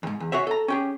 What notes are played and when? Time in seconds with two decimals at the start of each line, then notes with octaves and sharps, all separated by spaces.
0.03 E2 G#2
0.20 E2
0.32 F#4 G#4 C#5 E5
0.47 A4 A#5
0.68 C#4 G4 G#4